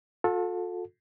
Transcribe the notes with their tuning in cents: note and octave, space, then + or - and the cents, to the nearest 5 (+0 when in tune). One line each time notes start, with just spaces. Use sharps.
F4 +45 A4 +0